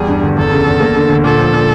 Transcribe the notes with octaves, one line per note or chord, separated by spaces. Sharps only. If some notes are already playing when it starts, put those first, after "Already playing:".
Already playing: E2 G3 G#4
G2
G1
E2 A4
C#3
E2
A#3
D3
D2
A#2 A4
F3
A#2